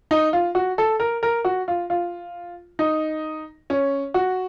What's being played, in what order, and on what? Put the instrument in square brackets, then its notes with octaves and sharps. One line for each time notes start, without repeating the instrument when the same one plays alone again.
[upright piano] D#4
F4
F#4
A4
A#4
A#4
F#4
F4
F4
D#4
C#4
F#4